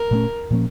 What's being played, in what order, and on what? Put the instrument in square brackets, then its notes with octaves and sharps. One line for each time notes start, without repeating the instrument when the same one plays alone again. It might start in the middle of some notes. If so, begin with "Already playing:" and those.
Already playing: [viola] A#4
[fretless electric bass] A#2 A3 C#4
A#2 F3 A#3 C#4